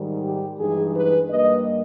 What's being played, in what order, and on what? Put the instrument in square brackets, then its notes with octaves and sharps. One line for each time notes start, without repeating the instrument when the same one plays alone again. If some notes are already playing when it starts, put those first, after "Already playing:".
Already playing: [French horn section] G#2 D#3 G3
G4
G2 E3 G#3 D#4 G#4
B4
G2 G3 A#3 D#5